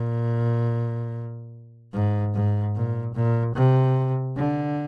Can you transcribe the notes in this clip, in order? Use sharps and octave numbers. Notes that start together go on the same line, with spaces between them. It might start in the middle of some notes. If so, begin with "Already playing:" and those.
Already playing: A#2
G#2
G#2
A#2
A#2
C3
D3